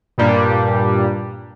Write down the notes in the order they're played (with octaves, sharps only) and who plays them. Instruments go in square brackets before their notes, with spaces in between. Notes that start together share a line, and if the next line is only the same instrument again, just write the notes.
[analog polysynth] G2 A#2 G3 A#3 D4